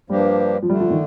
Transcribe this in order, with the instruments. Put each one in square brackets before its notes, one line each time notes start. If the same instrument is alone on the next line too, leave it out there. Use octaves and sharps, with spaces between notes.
[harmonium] G2 F3 A#3 D4 G4 [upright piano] G3
[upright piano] F3
[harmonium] D3 A3 D4 [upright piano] G3
[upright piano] F3
D#3